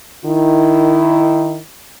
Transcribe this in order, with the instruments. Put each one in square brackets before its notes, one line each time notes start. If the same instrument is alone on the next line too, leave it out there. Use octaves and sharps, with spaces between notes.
[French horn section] D#3 E4